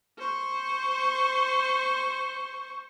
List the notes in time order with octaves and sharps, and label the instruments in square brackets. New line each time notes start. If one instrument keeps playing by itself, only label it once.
[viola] C5 C#6